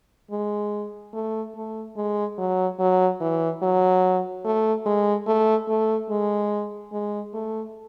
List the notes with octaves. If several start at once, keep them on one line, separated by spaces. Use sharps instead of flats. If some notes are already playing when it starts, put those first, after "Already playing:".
G#3
A3
A3
G#3
F#3
F#3
E3
F#3
A3
G#3
A3
A3
G#3
G#3
A3